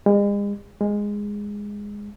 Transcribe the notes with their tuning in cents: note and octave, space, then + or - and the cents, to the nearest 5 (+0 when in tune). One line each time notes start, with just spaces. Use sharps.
G#3 -40
G#3 -10